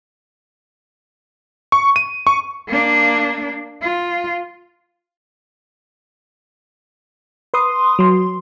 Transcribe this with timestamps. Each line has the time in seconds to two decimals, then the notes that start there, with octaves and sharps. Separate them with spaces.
1.72 C#6
1.96 D#7
2.27 C#6
2.68 A#3 D4
3.82 F4
7.54 B4 C6 D#6
7.99 F#3 C6